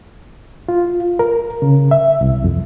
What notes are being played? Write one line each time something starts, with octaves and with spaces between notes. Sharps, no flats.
F4
A#4
C#3
E5
C2
F2